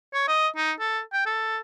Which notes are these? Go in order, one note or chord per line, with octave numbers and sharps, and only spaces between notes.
C#5
D#5
D#4
A4
G5
A4